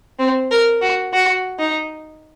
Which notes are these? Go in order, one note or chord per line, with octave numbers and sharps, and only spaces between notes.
C4
A#4
F#4
F#4
D#4